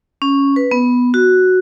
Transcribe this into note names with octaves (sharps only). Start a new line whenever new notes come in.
C#4
B4
B3
F#4